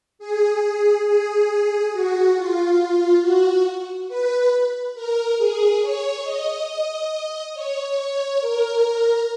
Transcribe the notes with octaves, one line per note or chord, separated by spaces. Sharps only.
G#4
G#4
F#4
F4
F#4
B4
A#4
G#4
C#5
D#5
C#5
C#5
A#4